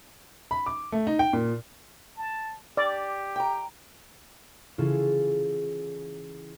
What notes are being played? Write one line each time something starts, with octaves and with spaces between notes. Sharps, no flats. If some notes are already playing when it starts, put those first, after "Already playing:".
B5
D6
A3
D#4
G5
A#2
A5
G4 D5
G5 A#5
C#3 E3 C#4 E4 F4 A4